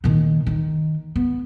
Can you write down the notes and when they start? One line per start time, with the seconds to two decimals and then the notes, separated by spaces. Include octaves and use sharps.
0.04 A#2 D#3
0.46 D#3
1.16 B3